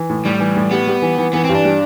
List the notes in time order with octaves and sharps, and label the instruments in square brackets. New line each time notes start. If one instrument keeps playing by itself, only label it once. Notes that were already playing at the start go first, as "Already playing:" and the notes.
Already playing: [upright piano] E3
A2
[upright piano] A2 [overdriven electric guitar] G3
[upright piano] E3
A2
[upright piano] G3 [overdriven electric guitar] B3
[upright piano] G3
E3
E3
[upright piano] E3 [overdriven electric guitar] B3
[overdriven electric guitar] C4
[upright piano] G2
[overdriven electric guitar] D4
[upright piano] G3